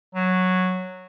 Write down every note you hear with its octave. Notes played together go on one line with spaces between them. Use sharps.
F#3